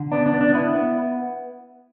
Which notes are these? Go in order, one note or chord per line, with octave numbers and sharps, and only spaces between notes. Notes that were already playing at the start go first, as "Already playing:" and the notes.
Already playing: D3
B3 D4
D4
B3
D4
B3 E4
B3